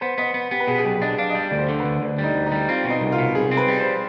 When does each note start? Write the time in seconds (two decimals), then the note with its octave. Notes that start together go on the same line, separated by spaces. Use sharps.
0.01 B3 C5
0.18 B3 D#5
0.34 B3
0.51 B3 G4
0.60 B4
0.68 B2 G#4
0.78 G#4
0.85 B1 G4
1.02 D4 D#5
1.18 D4 F5
1.30 D#5
1.35 G3 D5
1.51 D2 D5
1.58 C5
1.69 D3
1.80 D2 B4
2.02 D2 D4
2.18 G3
2.24 D#4
2.35 D2
2.46 D#4
2.52 G3
2.68 C4 F4
2.85 B2
2.90 D#4
3.01 C2
3.12 F4
3.18 B2
3.35 C2 G#4
3.51 C4
3.57 B4
3.68 G3
3.80 C5